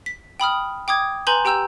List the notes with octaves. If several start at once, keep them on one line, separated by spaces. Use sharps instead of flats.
B6
G5 B5 D#6 F6
G5 D6 D#6 G#6
B4 G#5 A#5 C6 G6 F#7
G4 G5 A#5 E6 G6 E7